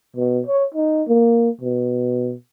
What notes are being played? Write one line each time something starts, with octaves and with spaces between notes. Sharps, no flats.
B2
C#5
D#4
A#3
B2